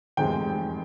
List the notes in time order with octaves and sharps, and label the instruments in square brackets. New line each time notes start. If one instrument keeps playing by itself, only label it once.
[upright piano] F1 E2 C3 F3 G#3 G5